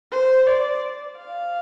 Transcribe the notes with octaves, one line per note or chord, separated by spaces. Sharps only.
C5
D5
F5